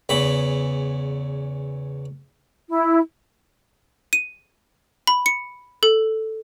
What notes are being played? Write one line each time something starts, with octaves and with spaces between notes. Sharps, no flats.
E2 C#3 B5
E4
D#7
B5
C#7
A4